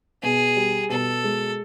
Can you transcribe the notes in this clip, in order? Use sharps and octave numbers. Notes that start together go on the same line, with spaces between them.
B2 G#4
G3
B2 A4
G#3